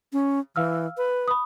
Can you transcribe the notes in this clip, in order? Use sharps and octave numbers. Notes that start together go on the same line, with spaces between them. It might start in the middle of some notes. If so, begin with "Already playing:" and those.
C#4
E3 F5 E6 F6
B4
B5 D#6